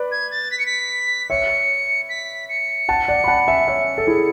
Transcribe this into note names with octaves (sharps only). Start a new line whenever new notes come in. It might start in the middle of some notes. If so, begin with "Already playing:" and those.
Already playing: B4 D5
G#6
A6
B6
C#7
B6
C#5 E5 C#7
B6
C#7
F#5 A5
D5 F#5
B5
F#5 A5
E5 G#5
C#5 E5
A4
E4 G#4